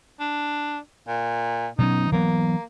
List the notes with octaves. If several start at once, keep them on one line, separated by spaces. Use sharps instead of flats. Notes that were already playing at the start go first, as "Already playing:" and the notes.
D4
A#2
B2 F#3 C#4 D#4
E3 F#3 A#3 B3